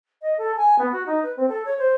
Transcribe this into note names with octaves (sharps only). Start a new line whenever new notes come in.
D#5
A4
G#5
B3
F#4
D#4
B4
C4
A4
C#5
C5